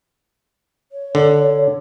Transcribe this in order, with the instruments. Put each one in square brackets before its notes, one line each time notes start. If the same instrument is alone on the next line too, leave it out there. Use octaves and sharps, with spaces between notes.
[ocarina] C#5
[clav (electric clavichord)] D3